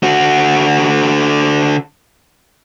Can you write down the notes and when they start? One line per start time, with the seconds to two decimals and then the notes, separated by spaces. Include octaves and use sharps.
0.03 D3 F#4